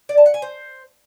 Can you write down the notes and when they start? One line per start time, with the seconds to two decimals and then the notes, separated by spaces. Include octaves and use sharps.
0.09 D5
0.17 A5
0.26 F#5
0.34 G#5
0.42 C5